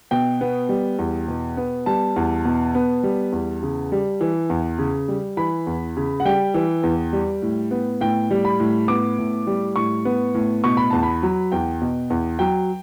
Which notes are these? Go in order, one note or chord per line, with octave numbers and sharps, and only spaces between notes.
B2 G5
B3
G3
E2
B2
B3
G3 A5
E2
B2
B3
G3
E2
C#3
G3
E3
E2
C#3
G3
E3 B5
E2
C#3
F#5
G3 G5
E3
E2
G3
A2
B3
A2 G5
G3
B5
A2
B3 D6
A2
G3
A2 C#6
B3
A2
B2 C#6
B5
E2 A5
B5
F#3
E2 G5
B2
E2
F#3 G5